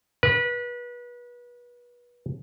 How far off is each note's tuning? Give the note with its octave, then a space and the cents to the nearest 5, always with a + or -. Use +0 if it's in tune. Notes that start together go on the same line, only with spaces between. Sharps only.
B4 -30